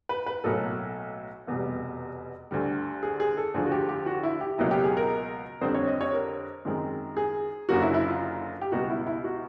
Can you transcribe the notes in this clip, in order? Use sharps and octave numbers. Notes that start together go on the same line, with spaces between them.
B4
B4
B1 A2 F#3 A#3 A4
F1 E2 B2 G3
D2 D3 G3
G#4
G#4
A4
D2 D3 F3 G#4
F#4
G4
G4
F#4
E4
G4
C#2 B2 F#3 A#3 E4
G4
G#4
A#4
F2 D3 G3 C4 C5
C#5
D#5
C#5
A#4
F#2 D#3 G#3 C4
G#4
F#1 F#2 D3 F#3 A#3 F#4
E4
E4
F4
G4
C#2 B2 G3 B3 F#4
E4
E4
F#4